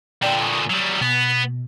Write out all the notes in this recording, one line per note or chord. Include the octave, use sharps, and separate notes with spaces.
A#2 D3 D5 G5
G#5 C#6 D#6
F#3 G3
B2 B3